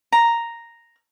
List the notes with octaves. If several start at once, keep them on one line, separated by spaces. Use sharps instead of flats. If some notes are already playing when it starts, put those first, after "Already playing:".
A#5